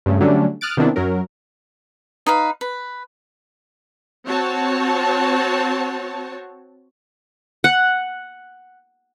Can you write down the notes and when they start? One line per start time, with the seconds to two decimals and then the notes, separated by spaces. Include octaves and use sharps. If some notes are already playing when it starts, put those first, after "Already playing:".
0.06 G2 C#3 A3
0.21 D3 F#3 G3 A3 C#4 D4
0.61 D#6 F6 F#6 A6 D7
0.77 C3 D#3 B3 D4 E4
0.96 F#2 F#3 A#4
2.27 D#4 B4 F5
2.61 B4
4.27 C4 F#4 C#5 A5
7.64 F#5